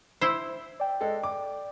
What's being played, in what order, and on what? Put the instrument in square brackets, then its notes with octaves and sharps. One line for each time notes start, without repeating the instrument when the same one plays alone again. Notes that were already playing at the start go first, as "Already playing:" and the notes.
[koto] E4 C5
[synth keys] D5 G5
[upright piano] G#3 A4
D6